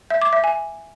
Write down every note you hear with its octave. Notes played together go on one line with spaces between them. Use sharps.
E5
D6
E5
G#5